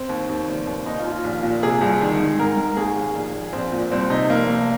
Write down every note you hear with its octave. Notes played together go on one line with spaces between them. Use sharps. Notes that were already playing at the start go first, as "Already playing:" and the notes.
Already playing: C4
D#2
D#2
F1
D#2
D#2 D#4
F4
D#2
F4
A#1
A#2
C3 G#4
C2
D#3
G#2
G#2 A#4
G#2
D#2 G#4
D#2
A#1
A#1
A#1 C4
A#2
C2 C4
C3 D#4
F1 A#3
F1